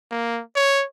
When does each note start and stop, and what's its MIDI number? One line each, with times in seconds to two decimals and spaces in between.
0.11 0.41 58
0.56 0.85 73